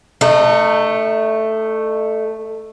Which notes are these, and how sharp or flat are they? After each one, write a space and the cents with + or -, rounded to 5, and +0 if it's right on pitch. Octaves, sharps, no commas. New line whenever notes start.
A3 +5 D#4 -35